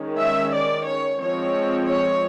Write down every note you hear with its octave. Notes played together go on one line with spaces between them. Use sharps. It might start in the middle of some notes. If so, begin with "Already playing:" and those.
Already playing: D#3 G#3 C#4
E5
D5
C#5
F3 G#3 C4 C#5
C#5